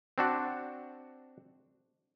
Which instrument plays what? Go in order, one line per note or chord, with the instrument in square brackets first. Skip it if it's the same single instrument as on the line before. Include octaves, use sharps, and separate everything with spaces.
[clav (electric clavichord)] C4 D4 F#4